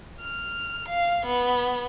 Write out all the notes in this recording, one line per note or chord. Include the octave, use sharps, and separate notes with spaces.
F6
F5
B3